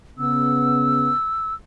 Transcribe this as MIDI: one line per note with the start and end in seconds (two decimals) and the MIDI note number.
0.19 1.12 49
0.19 1.12 59
0.19 1.54 88